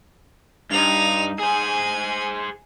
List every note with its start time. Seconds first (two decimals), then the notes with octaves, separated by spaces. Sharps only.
0.71 G2 D#4 F7
1.39 G#4 C5 G#5